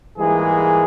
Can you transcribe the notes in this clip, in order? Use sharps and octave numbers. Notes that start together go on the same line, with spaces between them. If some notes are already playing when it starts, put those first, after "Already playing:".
G#2 E3 G3 G#3 A#3 G#4